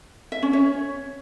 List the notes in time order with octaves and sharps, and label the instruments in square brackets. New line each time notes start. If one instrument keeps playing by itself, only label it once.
[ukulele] E5
C#4
C#5